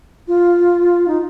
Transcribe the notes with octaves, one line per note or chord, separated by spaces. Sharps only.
F4
D#4